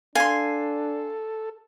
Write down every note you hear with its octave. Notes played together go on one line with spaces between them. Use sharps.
D4 A4 F5 G#5 C6